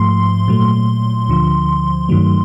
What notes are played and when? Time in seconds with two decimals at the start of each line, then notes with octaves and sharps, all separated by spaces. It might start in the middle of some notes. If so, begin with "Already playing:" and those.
Already playing: G#2 F3 A3 C6
0.48 A#2 F#3 A3
1.29 D2 D3 F3
2.09 G2 D#3 F#3 A3